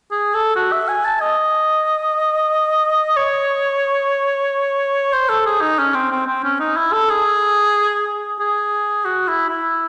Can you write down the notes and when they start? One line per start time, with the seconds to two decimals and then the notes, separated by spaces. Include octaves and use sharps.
0.11 G#4
0.34 A4
0.56 F#4
0.72 E5
0.88 G#5
1.05 A5
1.20 D#5
3.17 C#5
5.13 C5
5.29 A4
5.46 G#4
5.61 D#4
5.79 C#4
5.94 C4
6.11 C4
6.27 C4
6.44 C#4
6.60 D#4
6.76 E4
6.93 A4
7.09 G#4
8.39 G#4
9.05 F#4
9.27 E4
9.49 E4